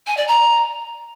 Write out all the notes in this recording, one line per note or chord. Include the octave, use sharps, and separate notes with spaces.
G#5
D5
A#5